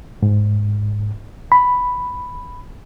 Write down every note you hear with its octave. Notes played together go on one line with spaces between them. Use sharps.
G#2
B5